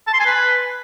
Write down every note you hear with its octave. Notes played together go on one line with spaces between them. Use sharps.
A5
C6
G#5
B4